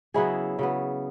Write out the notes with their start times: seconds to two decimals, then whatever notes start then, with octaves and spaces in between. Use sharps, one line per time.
0.14 C#3 F#3 B3 E4 G#4
0.59 C#3 F#3 B3